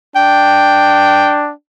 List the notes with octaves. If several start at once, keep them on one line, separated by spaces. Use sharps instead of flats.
D4 G5